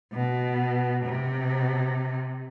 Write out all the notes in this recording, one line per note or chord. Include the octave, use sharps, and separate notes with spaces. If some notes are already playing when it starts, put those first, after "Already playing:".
B2
C3